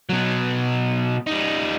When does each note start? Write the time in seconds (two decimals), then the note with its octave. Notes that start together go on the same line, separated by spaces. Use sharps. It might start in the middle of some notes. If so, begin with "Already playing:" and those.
0.09 B2 F#3
1.27 G3 D#4